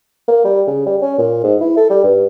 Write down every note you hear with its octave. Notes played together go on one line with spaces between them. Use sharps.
A#3
G3
C#3
G3
C#4
A#2
G#2
E4
A4
G3
G2